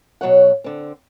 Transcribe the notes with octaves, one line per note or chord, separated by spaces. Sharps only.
B2 F#3 C#5 F#5
D3 C4